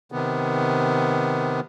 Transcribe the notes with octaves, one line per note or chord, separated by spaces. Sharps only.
C3 D#3 B3